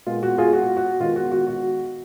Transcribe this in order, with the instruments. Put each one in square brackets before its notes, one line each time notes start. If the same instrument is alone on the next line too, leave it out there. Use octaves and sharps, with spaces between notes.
[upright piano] A#2 G#3 B3 F4
F#4
F4 G#4
F#4
F#4
D#3 G#3 B3 F4
F#4
F#4
F#4